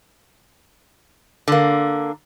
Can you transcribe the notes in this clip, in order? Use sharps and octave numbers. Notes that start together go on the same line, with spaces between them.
D3 A#3